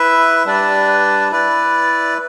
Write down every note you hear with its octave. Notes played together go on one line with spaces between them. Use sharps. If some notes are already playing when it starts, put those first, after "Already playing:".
Already playing: E4 B4 E5
G3 D4 B4 D5
E4 B4 D5